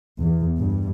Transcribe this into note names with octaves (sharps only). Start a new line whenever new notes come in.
E2
G2